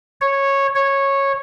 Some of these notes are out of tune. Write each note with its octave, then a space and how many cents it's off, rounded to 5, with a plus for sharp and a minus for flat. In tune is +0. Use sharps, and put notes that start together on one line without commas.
C#5 -10
C#5 -10